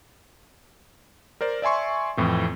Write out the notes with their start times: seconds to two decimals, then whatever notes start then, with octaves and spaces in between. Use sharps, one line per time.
1.41 A#4 C5 D5
1.62 D5 E5 G#5 C6 C#6
2.17 F2 A2 E3